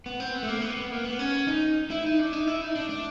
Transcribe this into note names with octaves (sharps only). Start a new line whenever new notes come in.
B3
C4
B3
A3
A#3
B3
B3
A#3
B3
C#4
D#4
E4
D#4
D4
D#4
E4
D#4
D4
D4